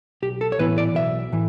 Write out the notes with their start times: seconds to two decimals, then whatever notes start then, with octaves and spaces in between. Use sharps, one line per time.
0.22 B1 G4
0.41 A4
0.52 C#5
0.59 A2 E3 B3 E4 B4
0.78 D5
0.95 B1 E5
1.32 A2 E3